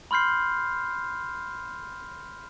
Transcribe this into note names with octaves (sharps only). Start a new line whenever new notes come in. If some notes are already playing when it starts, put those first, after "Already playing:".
B5 C6 F6 G6 C7